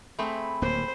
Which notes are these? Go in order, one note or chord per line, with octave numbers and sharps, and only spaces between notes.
A3 C4 G#4 B5
D1 D#2 A#3 C5